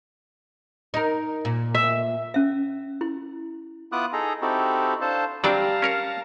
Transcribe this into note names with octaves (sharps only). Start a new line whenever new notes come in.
D#4 A#4
A#2
E5
C#4 E5
E4
B3 E4 F4 D6 D#6 F#6
D#4 G#4 A4 A#5
C4 D#4 E4 F#4 G4 A4
D4 A4 C5 F5 A5
F#3 G3 C4 D4 D5 F5 A5 A#5
C#4 A#4 C#5